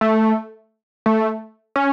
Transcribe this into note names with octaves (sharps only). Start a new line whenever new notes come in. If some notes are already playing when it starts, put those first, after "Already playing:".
A3
A3
C#4